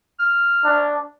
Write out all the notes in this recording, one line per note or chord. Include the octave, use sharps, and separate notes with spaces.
F6
D4